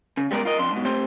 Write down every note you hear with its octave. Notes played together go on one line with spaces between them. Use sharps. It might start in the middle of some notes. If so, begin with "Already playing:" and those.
C#3
G3 G#3 B3 A4 A#4 D5
F4 A#4 D#5
F2 D4 C6
G#2 B2
A3 C4 G4 C5 C6